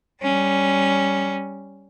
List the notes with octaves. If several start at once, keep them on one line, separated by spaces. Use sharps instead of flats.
G3 C#4